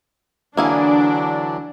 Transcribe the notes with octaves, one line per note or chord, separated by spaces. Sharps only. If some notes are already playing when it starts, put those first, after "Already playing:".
D3 E3 F#3 A#3 D4 E4 G#4